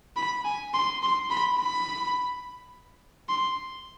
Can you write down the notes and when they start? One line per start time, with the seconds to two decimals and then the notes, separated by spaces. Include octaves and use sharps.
0.16 B5
0.45 G#5
0.74 C6
1.03 C6
1.31 B5
1.59 B5
3.29 C6